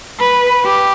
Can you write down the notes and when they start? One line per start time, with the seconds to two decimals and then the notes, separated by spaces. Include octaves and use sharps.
0.19 B4
0.65 G4